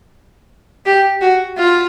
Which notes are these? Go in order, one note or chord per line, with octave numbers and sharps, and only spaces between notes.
G4
F#4
F4